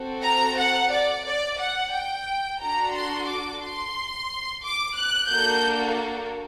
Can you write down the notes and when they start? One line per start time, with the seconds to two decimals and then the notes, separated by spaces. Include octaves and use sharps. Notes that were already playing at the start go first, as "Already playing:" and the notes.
Already playing: C4 F#4 A4
0.24 A#5
0.58 F#5
0.93 D5
1.25 D5
1.60 F#5
1.93 G5
2.60 D4 F#4 A4 A#5
2.95 C6
3.28 D6
3.63 C6
4.63 D6
4.96 F#6
5.30 A#3 D4 F#4 A4 G6